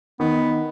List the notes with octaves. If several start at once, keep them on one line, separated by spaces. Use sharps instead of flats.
D#3 B3